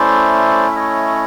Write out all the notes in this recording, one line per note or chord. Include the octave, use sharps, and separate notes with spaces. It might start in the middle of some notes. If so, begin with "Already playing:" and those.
Already playing: A3 C#4 E4 C5 D5
E5
C#5 D#5